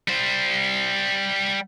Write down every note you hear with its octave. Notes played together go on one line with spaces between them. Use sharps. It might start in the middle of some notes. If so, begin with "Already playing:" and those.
G3 C5